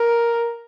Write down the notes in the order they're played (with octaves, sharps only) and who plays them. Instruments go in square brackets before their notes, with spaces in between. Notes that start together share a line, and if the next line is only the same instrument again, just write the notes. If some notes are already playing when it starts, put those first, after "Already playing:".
Already playing: [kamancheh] A#4